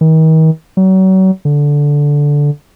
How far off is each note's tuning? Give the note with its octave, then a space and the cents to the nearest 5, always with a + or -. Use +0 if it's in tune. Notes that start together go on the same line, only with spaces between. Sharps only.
D#3 +40
F#3 +35
D3 -10